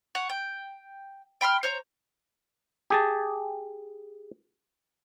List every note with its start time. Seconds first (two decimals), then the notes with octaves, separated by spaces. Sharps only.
0.15 C#5 F#5
0.30 G5
1.41 G5 B5 C6 F6
1.63 C5 C#5 A#5
2.90 G4 G#4 A5